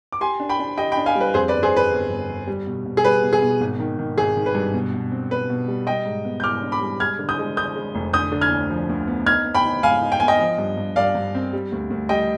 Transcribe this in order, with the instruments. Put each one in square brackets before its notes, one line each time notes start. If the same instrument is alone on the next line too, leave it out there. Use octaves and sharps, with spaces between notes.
[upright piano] D6
[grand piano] G4 [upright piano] G#5 C6
[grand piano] D4
[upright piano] G5 B5
[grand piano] D4
[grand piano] G4 [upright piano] D#5 G5
[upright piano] G5 B5
[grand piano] D4
[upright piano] F5 G#5
[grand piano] G3
[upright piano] B4
[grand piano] F2 [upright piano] G#4 C5
[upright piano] B4 D5
[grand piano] G1
[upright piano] G#4 C5
[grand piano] G1 [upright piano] B4
[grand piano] G1
G1
G1
G3
B2
B2
[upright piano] G#4
[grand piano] G3 [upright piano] B4
[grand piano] B2
[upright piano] G#4
[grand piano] B2
G#1
D#3
D#3
[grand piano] G#1 [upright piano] G#4
[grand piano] D#3
[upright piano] B4
[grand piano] G2
B2
B2
C4
[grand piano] B2 [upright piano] B4
[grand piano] B2
G3
[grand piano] G3 [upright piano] D#5 G5
[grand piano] G#2
B3
[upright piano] G6
[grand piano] G#2 [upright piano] D6 F6
[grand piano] D4
[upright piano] B5 D6
[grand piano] G3
[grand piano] G#3 [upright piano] F6 G#6
[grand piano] D3
[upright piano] D#6 G6
[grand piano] G#3
[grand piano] D3 [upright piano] D#6 G6
[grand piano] G#3
F1
[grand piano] D3 [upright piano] D#6 G6
[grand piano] D3
[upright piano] F6 G#6
[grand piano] D2
F3
D2
B3
[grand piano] D#4 [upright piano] F6 G#6
[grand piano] B3
[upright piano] G5 B5
[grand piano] D#4
[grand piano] G#2 [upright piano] F5 G#5
[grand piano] D#4
[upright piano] G5
[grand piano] B3 [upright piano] G#5
[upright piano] D#5 G5
[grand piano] F3
G2
G2
[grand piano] G2 [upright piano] D5 F5
[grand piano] G2
C4
G3
D2
D2
[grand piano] G3 [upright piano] D#5 G5